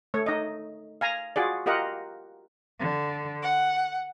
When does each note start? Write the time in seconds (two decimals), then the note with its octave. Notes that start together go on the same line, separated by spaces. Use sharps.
0.14 A3 C#5
0.26 D#4 D#5
1.01 F5 G#5 A#5
1.36 F4 F#4 G#4 D5
1.66 F4 G4 A#4 D#5 F#5
2.78 D3
3.42 F#5